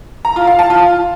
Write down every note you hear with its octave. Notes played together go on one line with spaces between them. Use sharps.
A#5
F4
F5
A5
F4